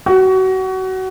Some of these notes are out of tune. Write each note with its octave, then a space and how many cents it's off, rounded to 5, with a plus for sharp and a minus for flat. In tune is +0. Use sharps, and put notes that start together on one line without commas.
F#4 +25